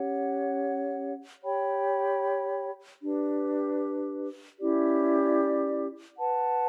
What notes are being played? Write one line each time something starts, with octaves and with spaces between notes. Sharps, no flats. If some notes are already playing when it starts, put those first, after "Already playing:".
Already playing: C#4 G4 C#5 F#5
G4 C#5 G5 B5
D4 G4 B4
C#4 E4 G4 D5
B4 F#5 A5